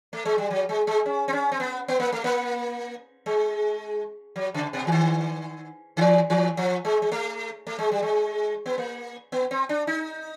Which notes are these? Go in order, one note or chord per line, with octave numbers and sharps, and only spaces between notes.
A3
G#3
G3
F#3
G#3
G#3
C#4
C4
C#4
C4
B3
B3
A#3
A3
A#3
G#3
F#3
C#3
B2
E3
D#3
D#3
E3
E3
F3
G#3
G#3
A3
A3
G#3
G3
G#3
B3
A#3
B3
C4
D4
D#4